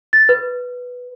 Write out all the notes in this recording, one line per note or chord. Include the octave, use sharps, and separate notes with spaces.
A6
B4